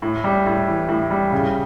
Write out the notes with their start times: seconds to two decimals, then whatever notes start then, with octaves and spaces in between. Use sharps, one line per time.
0.02 A2
0.24 G3
0.46 A2
0.68 E3
0.89 A2
1.10 G3
1.32 C#3